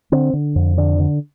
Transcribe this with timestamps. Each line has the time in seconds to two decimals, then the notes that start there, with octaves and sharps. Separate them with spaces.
0.12 D3 C4
0.33 D3
0.56 F2
0.77 D3 D4
1.00 D3